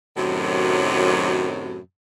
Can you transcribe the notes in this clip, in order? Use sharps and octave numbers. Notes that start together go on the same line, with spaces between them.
F#2 A2 C3 D#3 F#3